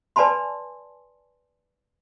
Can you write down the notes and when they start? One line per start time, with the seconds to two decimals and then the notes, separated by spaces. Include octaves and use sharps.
0.16 B4 D5 G#5 A5 B5 C6